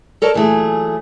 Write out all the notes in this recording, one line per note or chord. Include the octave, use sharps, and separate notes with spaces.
A4 A#4 C#5 D5 A5
A#2 E3 F#3 A3 G#4